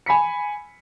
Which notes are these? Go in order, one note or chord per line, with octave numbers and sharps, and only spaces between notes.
G#5 B5 B6 C#7